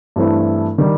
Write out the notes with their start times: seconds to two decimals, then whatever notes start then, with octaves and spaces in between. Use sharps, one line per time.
0.16 G2 E3 A3 C4 E4
0.78 D#3 G3